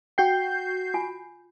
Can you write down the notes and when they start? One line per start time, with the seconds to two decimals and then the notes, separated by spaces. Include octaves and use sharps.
0.18 F#4 G5 G6 C7
0.94 F4 G#5